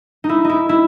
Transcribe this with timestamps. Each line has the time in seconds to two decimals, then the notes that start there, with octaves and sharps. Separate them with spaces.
0.24 D#4
0.29 E4
0.44 D#4 E4
0.69 E4